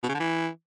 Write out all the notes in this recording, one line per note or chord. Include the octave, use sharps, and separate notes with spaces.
B2
C#3
D3
E3